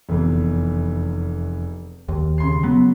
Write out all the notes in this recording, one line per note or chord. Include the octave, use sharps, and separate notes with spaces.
F1 E2
D#2
C#3 C6 C7
F#3 B3